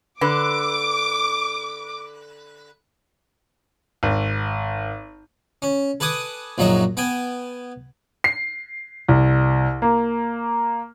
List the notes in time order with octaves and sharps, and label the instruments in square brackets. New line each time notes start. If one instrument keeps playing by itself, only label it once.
[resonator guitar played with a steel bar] D3 B4 [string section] D6
[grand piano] G#1
[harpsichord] C#4
A4 B4 G#5 D6 D#6
A#1 F#2 F#3 D#4 E5
B3 G5 G#5
[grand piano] C7
C2
A#3